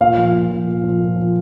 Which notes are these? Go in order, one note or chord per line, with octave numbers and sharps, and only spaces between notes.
A#2 F5
F3
A#2
F3
A#2
F3
A#2
F3